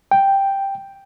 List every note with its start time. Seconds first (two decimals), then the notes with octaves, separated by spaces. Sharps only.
0.11 G5